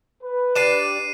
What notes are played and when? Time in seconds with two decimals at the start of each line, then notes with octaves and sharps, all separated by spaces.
0.22 B4
0.55 D4 G4 D5 C7 D#7 E7